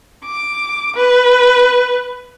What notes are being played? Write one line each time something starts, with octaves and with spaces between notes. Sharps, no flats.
D6
B4